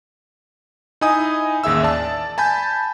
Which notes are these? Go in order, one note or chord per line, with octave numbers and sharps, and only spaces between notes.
D#4 E4 D#5 G#5 D#6
A1 D#2 G#4 E5 E6
D5 A5
G#5 A5 B5 G6